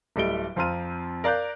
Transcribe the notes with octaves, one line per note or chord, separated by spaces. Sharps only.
D1 G3 A3 D#5 D7 G7
F2 C4 F4 A#5 F6 D#7
A#4 D5 F5 F#6 G6